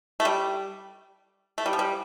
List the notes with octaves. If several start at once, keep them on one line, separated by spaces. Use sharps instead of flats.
A3
G3
A3
G3
F3
G3